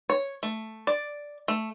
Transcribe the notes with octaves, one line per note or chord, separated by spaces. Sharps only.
C#5
A3
D5
A3